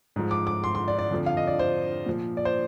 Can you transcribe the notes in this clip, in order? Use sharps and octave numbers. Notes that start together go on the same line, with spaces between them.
G#2 F3
D6
D6
C6
C6
D5
D5
F2 D3 F3
F5
D#5
D5
C5
A#2 F3
D5
C5